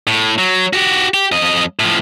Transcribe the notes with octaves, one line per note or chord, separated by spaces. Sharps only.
A2
F#3
F#4 G4
G4
F2 D#5
A2 F3